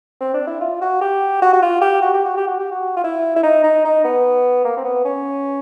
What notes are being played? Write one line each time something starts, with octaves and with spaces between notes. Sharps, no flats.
C4
D4
E4
F4
F#4
G4
F#4
F#4
F4
G4
F#4
G4
F#4
G4
F#4
G4
F#4
F4
E4
E4
D#4
D#4
D#4
B3
A#3
C4
B3
C#4